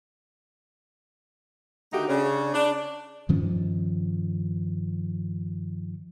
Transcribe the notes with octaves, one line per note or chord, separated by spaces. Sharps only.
D3 D#3 A3 D#4 F#4 G4
C#3 C#4 D4
D4
G2 D#3 F3 C#4